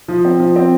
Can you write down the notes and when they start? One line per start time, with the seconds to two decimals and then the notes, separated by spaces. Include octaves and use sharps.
0.08 F3
0.25 C4
0.40 F3
0.56 C4